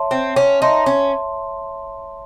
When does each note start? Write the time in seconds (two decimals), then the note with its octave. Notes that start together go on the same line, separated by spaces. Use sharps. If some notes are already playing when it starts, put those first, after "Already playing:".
Already playing: C#5 E5 A5 C6
0.11 C4
0.36 C#4
0.61 D#4 C#5 E5 A5 C6
0.86 C#4